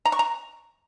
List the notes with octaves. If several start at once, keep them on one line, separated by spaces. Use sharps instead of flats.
A#5
C#6
A#5